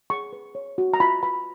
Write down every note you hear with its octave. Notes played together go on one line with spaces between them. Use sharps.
G#4 C#6
B4
C#5
F#4
A#5
F4 B5
B4 B5